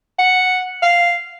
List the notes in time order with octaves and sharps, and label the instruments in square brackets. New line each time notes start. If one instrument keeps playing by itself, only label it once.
[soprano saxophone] F#5
F5